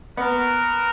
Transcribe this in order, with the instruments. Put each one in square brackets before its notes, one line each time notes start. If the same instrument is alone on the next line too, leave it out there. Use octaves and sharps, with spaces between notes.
[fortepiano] B3 [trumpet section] F#4 A#4